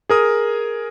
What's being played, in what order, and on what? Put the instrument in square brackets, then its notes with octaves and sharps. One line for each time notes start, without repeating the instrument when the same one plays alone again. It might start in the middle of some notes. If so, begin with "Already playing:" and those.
[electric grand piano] G#4 A#4 D#6